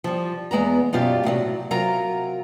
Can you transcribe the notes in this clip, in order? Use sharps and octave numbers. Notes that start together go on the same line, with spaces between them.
F3 G3
E2 G#3 B3 A#5
F#2 B2 F4 G4 D5
A2 C3 D#3 F#3
C3 F#3 F4 A#4 A#5